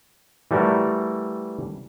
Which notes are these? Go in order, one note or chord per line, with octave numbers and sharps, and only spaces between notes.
E3 G3 A3 F#4 A#4